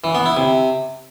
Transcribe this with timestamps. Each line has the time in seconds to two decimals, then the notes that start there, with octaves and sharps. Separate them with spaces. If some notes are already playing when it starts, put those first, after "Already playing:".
0.04 E3
0.15 B3
0.26 E4
0.37 C3